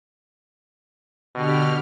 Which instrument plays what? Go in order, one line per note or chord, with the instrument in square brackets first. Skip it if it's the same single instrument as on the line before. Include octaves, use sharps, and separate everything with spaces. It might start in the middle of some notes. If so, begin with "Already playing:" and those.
[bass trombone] B2 [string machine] D3 G4 F6